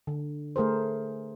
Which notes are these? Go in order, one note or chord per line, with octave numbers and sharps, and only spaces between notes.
D3
A3 G#4 A#4 C5